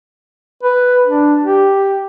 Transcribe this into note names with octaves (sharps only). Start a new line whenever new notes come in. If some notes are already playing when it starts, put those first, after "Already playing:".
B4
D4
G4